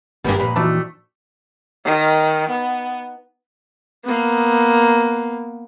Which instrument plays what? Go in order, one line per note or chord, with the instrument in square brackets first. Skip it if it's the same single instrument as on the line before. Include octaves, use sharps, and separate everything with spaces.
[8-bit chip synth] G#1 G2 [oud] G3 A#3 G4 [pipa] B3 G#4
[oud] F2 A#2 [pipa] B4
[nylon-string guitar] E3 D#4 F#4 [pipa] G3 A3 D4
[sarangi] D#3
B3
[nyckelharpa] A#3 B3